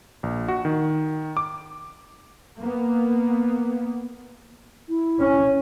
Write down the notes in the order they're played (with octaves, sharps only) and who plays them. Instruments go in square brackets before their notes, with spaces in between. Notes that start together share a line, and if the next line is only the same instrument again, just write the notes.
[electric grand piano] A#1
F#4
D#3
D6
[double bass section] A#3 B3
[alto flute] E4
[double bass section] C#4